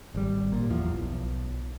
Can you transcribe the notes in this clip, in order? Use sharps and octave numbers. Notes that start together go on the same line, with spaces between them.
G#1 G3
A#2
E2 F3
B1